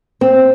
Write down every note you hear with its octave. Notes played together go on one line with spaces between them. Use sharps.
C4